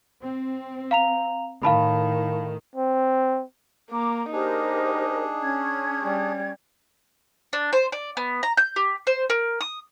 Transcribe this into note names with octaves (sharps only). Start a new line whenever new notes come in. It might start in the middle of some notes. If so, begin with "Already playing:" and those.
C4
F5 A#5 F7
A2 D#3 F5 A5 B5
C4
A#3 A#5 D6
D4 D#4 G4 G#4 A#4 C5
C#4 G#6
G3
D4
C5
D5
B3
A#5
G6
G4
C5
A#4
D#6